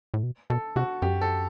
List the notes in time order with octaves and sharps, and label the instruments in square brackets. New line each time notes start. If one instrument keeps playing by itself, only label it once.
[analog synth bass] A2
B2
[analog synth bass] B2 [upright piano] A4
[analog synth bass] C3 [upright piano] F#4
[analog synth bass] F#2 [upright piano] G4
[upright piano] A4